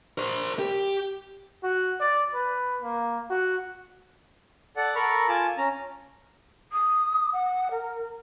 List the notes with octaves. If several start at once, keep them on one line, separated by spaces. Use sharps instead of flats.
A#4 C5
G4
F#4
D5
B4
A#3
F#4
A4 D5 F#5
A4 A#4 A#5 B5 C#6
F4 G#5 A5 D6
C#4 A#5
D#6
F#5
A#4